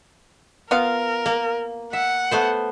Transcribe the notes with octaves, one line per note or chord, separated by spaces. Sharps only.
B3 F4 A#4 F5
A#3
E5 F#5
A3 B3 C5